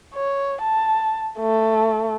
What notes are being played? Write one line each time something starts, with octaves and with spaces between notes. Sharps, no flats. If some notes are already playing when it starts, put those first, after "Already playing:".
C#5
A5
A3